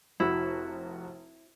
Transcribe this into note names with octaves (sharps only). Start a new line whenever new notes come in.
F1 E4 F#4